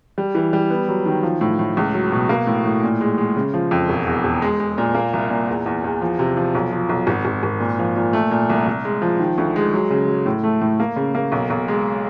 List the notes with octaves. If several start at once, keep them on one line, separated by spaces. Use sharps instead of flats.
G3
E3
G3
B3
F#3
D#3
F3
A2
A2
C#2
F#3
B2
A#3
A2
A2
A#2
G#3
G#3
C#3
F3
F2
E1
E2
E1
G#3
G#3
A#2
A#3
C2
A#2
E2
E2
E2
F3
C3
F3
B1
F3
B1
G#1
G#1
G#1
A#2
F3
A#2
A3
A#2
C2
C2
G#3
F3
D#3
D2
G#3
F#3
C#3
F#3
A2
A3
A2
A#3
C#3
A#3
B1
B1
G#3